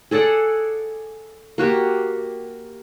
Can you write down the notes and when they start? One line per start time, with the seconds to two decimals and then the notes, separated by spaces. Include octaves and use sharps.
0.11 G#4 A4 D5 F#5
1.58 A#3 F#4 G4